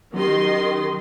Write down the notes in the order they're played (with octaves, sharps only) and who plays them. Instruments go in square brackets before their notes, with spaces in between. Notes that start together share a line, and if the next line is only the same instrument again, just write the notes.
[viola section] D#3 D#5 C6 [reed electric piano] F#3 C#4 G4